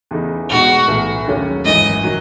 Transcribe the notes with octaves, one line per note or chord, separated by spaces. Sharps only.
E2 C#3 E3 A3 D#4
E2 B2 G#3 D#4 F#4
B1 A2 E3
D#2 C#3 F#3 A3 C#4
G#1 F#2 E3 D#5
D#3 F#3